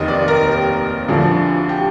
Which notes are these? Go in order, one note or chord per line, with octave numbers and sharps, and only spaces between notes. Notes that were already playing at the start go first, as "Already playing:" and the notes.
Already playing: F1 D#2 D#3 D#5
D5
A#4
G4
D2 D3 F3
G4